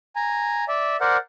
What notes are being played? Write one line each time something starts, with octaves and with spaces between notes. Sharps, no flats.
G#5 A#5
D5 E5
A#4 C5 D5 F#5